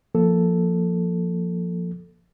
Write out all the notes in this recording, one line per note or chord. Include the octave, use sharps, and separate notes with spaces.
F3 A#3 A4